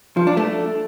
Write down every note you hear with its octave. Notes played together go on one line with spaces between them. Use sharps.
F3
D4
A3